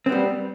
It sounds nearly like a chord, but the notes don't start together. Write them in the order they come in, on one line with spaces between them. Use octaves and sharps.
C4 B3 G3